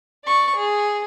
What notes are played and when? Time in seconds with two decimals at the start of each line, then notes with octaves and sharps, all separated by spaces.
0.24 D5 C#6
0.55 G#4